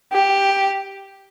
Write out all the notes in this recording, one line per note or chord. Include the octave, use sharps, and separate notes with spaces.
G4